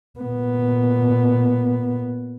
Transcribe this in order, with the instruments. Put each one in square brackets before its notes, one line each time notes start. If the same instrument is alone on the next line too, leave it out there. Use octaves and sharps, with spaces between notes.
[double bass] A#2 B3